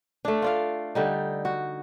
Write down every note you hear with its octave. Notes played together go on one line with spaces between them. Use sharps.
A3 D4
F4 D5 F5
D3 G3 D#4
F#4